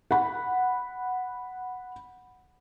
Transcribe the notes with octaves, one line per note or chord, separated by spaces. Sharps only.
F#5 B5